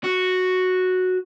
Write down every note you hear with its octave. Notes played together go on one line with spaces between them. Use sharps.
F#4